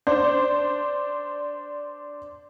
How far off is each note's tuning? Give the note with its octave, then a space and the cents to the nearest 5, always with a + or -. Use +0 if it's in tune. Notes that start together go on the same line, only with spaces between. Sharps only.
D4 -5 C5 +0